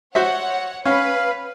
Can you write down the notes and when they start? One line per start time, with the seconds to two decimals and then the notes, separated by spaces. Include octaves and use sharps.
0.15 F#4 C5 C#5 E5 F#5
0.85 C#4 B4 F5